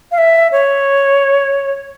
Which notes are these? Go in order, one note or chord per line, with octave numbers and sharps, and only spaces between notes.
F5
E5
C#5